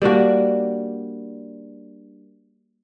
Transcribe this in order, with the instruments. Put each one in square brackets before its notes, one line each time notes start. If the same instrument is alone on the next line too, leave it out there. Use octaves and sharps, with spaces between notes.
[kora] G3 A#3 D4 F#4